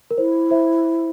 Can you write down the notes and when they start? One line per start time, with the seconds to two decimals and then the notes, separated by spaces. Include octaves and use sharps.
0.11 A#4
0.18 E4 C5
0.51 C5 E5